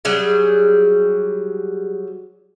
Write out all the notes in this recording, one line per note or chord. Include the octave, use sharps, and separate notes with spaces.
F#3 G3 G#4